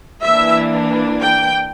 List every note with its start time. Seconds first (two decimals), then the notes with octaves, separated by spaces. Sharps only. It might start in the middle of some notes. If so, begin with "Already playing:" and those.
0.23 E3 A#3 D4 E5
1.20 G5